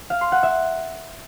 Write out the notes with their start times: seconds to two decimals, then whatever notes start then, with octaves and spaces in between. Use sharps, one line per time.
0.10 F5
0.21 C6
0.32 F#5
0.43 E5